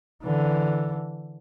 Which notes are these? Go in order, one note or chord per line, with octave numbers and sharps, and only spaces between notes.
D3 E3